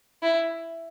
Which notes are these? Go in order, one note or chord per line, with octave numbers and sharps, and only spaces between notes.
E4